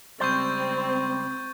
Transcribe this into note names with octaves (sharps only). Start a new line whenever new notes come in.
C#2 G3 C4 C5 C#6 G6 A6